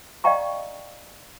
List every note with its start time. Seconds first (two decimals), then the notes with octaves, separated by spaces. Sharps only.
0.24 D5 D#5 F5 G5 A#5 C#6